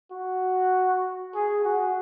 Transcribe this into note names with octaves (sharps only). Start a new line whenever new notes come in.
F#4
G#4
F#4